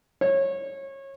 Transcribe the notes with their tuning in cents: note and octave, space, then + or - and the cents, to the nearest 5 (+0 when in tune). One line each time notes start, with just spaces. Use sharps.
C#5 -25